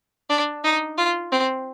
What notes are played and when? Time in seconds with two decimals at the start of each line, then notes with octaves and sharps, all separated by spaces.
0.29 D4
0.64 D#4
0.98 F4
1.32 C4